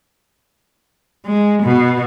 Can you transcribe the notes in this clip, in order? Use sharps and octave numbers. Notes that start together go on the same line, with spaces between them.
G#3
B2